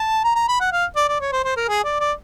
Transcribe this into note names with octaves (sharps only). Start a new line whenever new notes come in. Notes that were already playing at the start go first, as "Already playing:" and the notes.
Already playing: A5
A#5
A#5
B5
F#5
F5
D5
D5
C#5
C5
C5
A#4
G#4
D5
D5